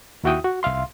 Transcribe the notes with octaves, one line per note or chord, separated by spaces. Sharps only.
D#2 E4 F#4 E5 G5 D#6
F#4
C2 E5 F5 C6